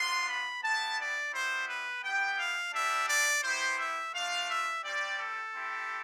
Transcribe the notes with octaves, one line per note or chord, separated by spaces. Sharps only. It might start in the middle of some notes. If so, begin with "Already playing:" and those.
Already playing: B3 D4 F4 C6
B5
B3 E4 G4 A5
D5
G3 B3 E4 C5
B4
B3 E4 G4 G5
F5
G3 B3 D4 G4 E5
D5
B3 E4 G4 C5
E5
A3 D4 F4 F5
E5
G3 C4 G4 D5
A4
C4 E4 G4